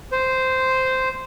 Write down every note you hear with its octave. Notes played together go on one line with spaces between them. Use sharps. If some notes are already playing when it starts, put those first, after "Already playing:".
C5